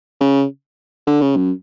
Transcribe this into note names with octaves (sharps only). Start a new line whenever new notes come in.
C#3
D3
C#3
F#2